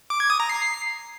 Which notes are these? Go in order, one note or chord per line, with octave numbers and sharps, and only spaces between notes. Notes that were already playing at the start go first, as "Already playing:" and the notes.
D6
G#6
D#6
A#5
C7